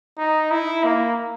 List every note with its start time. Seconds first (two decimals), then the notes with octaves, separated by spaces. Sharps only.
0.18 D#4
0.51 E4
0.84 A#3